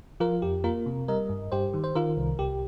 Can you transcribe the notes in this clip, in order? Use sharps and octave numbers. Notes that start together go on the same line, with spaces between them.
F3 F4 A#4
F2 G4
A#3 F4 A#4
C3
G3 A#4 D#5
G2
G2 G4 C5
D#3
C5
D#3 F4 A#4
C2
C2 G4